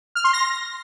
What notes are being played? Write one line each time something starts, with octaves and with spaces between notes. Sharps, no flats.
F6
C6
A#6